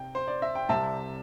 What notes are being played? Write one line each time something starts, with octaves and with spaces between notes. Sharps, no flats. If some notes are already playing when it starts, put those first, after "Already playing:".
Already playing: C3 G5
C5
D5
E5
G5
C2 C3 G3 C4 E5 A5